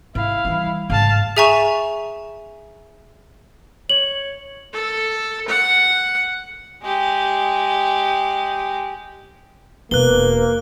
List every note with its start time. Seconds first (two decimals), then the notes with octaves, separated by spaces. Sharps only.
0.15 G#2 E4 F5
0.45 E3 G3
0.90 G#2 C#3 F5 A5
1.37 G#4 E5 G#5 A#5 C#6 E7
3.90 C#5 F#7
4.73 A4
5.48 F#5
6.83 G#3 G4
9.91 E1 A#3 B4 F#6 G7